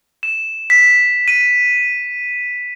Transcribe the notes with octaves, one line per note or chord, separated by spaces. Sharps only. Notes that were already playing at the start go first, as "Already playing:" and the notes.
E7
B6
D#7